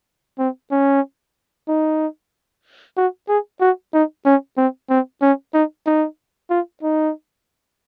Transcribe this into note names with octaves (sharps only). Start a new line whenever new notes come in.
C4
C#4
D#4
F#4
G#4
F#4
D#4
C#4
C4
C4
C#4
D#4
D#4
F4
D#4